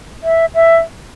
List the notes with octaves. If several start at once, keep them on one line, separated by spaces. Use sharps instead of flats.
E5
E5